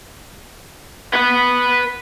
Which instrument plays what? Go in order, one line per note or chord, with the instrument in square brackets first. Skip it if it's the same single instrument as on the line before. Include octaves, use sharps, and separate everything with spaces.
[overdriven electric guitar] B4 F#5